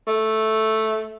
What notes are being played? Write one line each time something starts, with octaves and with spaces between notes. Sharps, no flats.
A3